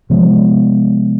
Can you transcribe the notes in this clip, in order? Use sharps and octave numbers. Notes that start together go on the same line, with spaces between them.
C3 F3 G#3 B3